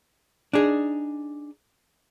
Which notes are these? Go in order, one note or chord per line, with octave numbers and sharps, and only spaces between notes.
D4 D#4 G#4